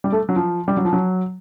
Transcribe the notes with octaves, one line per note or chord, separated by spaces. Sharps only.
G3
A3
F#3
F3
G3
F#3
F3
F#3